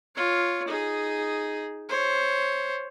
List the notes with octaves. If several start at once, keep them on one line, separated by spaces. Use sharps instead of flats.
F4 C#5
D#4 G#4
C5 C#5